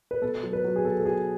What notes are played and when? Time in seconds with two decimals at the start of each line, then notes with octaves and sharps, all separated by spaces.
0.11 B4
0.22 B2 A4
0.43 F#3
0.53 B4
0.64 F#3
0.76 G#4
0.85 B2 A4
1.00 A4
1.06 B2 G#4